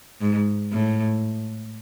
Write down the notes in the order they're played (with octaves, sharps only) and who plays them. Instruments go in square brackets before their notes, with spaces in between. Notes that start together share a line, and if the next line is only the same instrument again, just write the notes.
[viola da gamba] G#2
A2